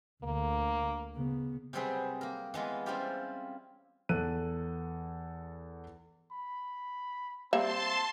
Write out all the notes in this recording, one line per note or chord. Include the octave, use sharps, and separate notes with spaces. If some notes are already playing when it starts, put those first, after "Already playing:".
D2 D3 A#3
C#3 B3
C3 F#3 G3 C4 G#4 B4
A#3 A#4
E3 G#3 B3 F4
G3 C4 C#4 E4 F4 G4
E2 A4 F#6 D#7
B5
G3 A#3 C4 E5 A5 C6